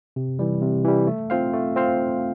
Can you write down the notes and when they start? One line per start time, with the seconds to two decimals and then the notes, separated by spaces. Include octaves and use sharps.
0.16 C3
0.39 E3 G3
0.62 C3
0.84 E3 G3
1.07 A3
1.30 C4 F4 C5 F5
1.53 A3
1.76 C4 F4 C5 F5